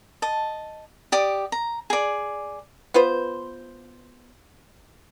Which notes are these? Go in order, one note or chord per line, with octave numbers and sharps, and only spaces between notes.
D#5 A5
G4 D5 D#6
A#5
G#4 D5
B3 F4 B4 C5